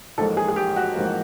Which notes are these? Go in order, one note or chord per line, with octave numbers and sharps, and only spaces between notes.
A1 G#2 F3 A#3 A4
G#4
G#4
G4
F#4
A1 G#2 F3 A#3